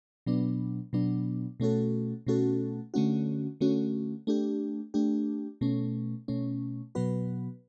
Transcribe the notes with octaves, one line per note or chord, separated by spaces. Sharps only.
B2 F#3 B3 D4
B2 F#3 B3 D4
B2 A3 C#4 F#4 A4
B2 A3 C#4 F#4 A4
D3 A3 C#4 F#4
D3 A3 C#4 F#4
A3 D4 G4
A3 D4 G4
B2 A3 C#4
B2 A3 C#4
B2 F#3 B3 F#4 B4